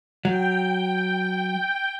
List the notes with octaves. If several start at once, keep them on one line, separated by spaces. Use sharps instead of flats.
F#3 G5